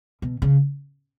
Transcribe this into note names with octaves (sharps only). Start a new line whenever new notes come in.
B2
C#3